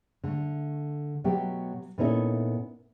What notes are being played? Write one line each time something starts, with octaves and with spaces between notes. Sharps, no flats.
D3 A3
B2 F#3 A3 B3 G4
A#2 B3 C#4 D#4 E4 A4